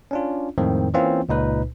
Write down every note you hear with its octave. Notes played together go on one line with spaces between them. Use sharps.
C#4 D4 F4
F2 A2 D#3 G#3 C4
E3 A#3 C4 C#4 E4 F4
C#2 A#2 D#4 B4